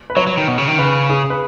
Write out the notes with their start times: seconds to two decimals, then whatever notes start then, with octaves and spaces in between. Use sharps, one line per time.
0.10 B4
0.17 F#3 C#5
0.27 F#3
0.37 D#3
0.48 B2
0.58 C#3
0.68 D#3
0.78 C#3 B4
1.09 G#4
1.30 B4